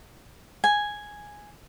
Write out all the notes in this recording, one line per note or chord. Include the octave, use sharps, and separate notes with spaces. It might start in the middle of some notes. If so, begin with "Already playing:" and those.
G#5